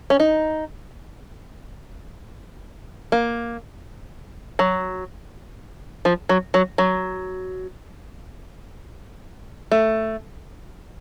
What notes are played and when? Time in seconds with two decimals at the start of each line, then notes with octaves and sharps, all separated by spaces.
0.10 C#4
0.20 D#4
3.12 A#3
4.59 F#3
6.05 F3
6.29 F#3
6.54 F#3
6.78 F#3
9.72 A3